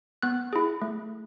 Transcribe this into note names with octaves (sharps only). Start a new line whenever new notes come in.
B3 F#6
E4 G#4
A3